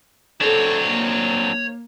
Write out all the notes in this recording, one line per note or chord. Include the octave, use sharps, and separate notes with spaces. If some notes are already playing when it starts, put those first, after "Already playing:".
F#3 C4 D4 A4 C#5
A#3